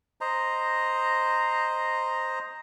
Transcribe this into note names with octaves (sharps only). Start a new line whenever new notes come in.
C5 D#5 A#5